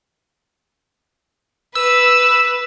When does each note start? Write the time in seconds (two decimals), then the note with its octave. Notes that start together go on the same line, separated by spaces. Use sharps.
1.75 B4 E6